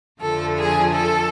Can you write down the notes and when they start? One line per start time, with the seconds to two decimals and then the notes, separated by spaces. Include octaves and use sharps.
0.20 F2 D3 F3 A3 A4
0.58 G#4
0.94 A4